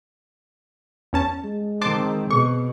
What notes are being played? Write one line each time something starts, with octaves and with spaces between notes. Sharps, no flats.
E2 C#4 A5
G#3
D#3 C4 C5 A5 C6 D6
B2 G#4 C#6